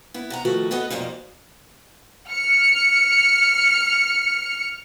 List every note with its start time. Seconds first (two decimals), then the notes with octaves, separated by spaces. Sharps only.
0.14 B3 E4
0.30 C3 F#5 A#5
0.45 D#3 F3 A3 F#4 B4
0.71 B3 A4 B4 D#5 F#5
0.90 F2 G#2 B2 G3 A#3
2.27 F6 C#7